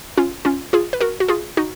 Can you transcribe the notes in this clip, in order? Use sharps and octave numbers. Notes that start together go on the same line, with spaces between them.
C#4 F4
C#4 F4
F4 G#4
B4
F#4 A#4
F#4
F4 G#4
D#4 F#4